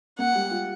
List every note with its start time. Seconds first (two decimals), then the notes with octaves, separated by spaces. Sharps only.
0.18 A#3 F#5
0.35 G3
0.51 F4